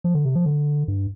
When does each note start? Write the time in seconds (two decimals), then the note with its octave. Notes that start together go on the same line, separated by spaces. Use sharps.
0.04 F3
0.15 D3
0.25 C3
0.36 F3
0.46 D3
0.88 G2